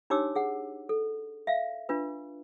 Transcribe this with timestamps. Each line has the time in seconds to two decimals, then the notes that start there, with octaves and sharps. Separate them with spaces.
0.10 D4 D#4 G4 C#5 D6 E6
0.35 G#4 F#5
0.89 A4
1.47 E5 F5
1.89 D4 F4 B4